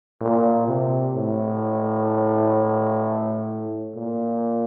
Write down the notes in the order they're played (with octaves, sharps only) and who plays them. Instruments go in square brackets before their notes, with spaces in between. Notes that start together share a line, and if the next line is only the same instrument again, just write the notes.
[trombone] A#2
C3
A2
A#2